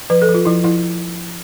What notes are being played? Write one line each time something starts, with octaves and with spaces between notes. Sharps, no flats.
F3 B4
A4
F3
F4
F3 E4
F3 E4